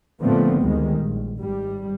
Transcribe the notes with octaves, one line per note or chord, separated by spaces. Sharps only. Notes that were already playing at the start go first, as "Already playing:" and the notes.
A#2 D3 F3 A3 B3 C4
D2 D#3 G3 G#3
A#1
G#1 G3